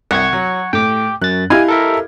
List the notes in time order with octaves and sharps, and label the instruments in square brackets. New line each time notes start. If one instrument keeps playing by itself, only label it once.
[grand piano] C2 [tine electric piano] F#5 C#6 G#6
[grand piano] F#3
[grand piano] A2 [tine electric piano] G5 D6
[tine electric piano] F#2 A6 [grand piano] F#6
[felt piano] E4 G4 [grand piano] D#5 F5 G#6 [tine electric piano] G#5
[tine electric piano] A4 A#4 E5